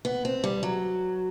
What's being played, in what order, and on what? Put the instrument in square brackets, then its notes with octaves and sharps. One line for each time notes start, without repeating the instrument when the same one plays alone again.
[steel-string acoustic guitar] B3
C4
G3
F#3